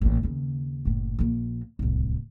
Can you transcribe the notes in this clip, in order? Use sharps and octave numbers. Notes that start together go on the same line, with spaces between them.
A1 A#2
D#2 C#3
F#1 A2
A#1 A#3
D1 C2